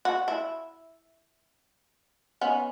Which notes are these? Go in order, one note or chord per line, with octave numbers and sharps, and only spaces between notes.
F#4
E4
B3 C#4 D#4